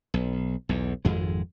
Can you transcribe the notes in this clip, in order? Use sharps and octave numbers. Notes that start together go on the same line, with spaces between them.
B1
B1 E2
G#1 F2 G#3